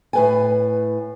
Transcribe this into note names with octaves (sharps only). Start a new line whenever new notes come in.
A2 B4 G#5